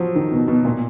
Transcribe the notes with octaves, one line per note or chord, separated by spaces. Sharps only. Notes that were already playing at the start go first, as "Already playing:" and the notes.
Already playing: F3 F#3
D#3
B2
B2
A#2